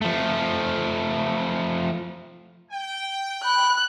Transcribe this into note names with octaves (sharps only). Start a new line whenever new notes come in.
F3 A3
G5
B5 F#6